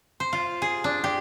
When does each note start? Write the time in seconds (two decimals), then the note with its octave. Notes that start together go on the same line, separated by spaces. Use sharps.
0.20 C5
0.33 F4
0.62 G#4
0.84 D4
1.04 G4